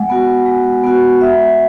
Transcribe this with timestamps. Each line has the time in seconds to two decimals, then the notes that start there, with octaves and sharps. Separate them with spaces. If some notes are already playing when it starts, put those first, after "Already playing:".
Already playing: G#3 F#5
0.10 B3 F#4
0.46 G#3
0.84 B3 F#4
1.21 G#3 E5